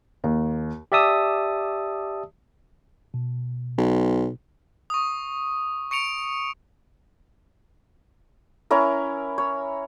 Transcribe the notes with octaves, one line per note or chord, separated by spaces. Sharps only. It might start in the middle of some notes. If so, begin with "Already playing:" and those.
D#2
G4 D5 E5 A5 D#6 E6
B2
B1
C#6 D#6
C#6 C#7 D7 F7
C#4 E4 A#4
C#5